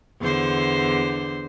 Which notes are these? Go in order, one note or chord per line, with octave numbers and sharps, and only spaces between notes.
E2 D3 C5